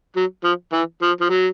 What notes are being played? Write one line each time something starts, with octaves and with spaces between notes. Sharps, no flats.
F#3
F3
E3
F3
F3
F#3